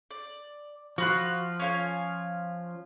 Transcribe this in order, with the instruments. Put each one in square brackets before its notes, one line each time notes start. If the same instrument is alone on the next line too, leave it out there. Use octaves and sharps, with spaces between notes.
[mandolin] D5
[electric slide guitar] F3 F4 [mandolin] F#4 B5 F#6
[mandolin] C#4 F5 G#5